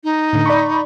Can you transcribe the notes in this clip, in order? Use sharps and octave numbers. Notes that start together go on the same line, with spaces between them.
D#4
A2 D3
D5 B5 C#6